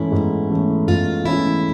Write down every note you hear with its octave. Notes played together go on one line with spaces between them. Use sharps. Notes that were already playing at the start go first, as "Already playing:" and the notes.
Already playing: G#2 E3 A3 C#4 E4
G#2
E3 A3 C#4
G#2 F4
E3 A3 C#4 E4